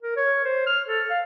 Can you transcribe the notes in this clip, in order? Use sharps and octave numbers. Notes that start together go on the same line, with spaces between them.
A#4
C#5
C5
F6
A4
F5